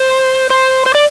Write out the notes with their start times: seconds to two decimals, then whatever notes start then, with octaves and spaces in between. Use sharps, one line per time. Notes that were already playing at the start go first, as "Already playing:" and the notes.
Already playing: C5
0.50 C5
0.86 C5
0.95 D5